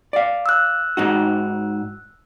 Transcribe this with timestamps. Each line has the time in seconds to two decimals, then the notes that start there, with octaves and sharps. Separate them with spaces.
0.13 D5 F5
0.46 E6 F#6
0.97 G#2 D#4 F#4